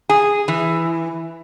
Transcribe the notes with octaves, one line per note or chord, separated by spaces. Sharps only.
G#4
E3